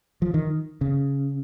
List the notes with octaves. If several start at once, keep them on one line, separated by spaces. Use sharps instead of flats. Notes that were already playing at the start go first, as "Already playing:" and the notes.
F3
D#3
C#3